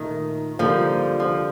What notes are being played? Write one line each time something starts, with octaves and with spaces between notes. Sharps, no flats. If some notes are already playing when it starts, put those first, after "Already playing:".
Already playing: A#2 D#3 A3 A4
D3 F3 G3 A#3 D#4
F3